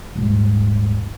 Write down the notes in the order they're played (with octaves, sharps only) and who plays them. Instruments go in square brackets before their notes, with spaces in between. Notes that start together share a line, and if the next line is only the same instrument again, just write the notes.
[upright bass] D#1 G#2